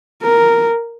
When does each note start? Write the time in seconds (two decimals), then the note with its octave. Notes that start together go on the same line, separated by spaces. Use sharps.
0.23 A#4